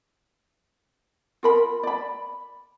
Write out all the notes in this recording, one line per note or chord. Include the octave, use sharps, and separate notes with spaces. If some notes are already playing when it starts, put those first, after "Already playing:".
F4 A#4 B5
D5 B5